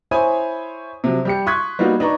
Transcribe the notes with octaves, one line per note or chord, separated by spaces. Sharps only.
E4 C5 C#5 G#5 B5 D#6
C3 F3 F#3
G3 G4 C#7
C6 C#6 D#6 F#6 G#6 B6
G3 A#3 B3 D#4 F4 F#4
D4 D#4 B4 A#5 C#6